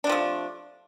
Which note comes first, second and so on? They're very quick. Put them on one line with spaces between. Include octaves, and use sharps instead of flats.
D4 C3 F3 A3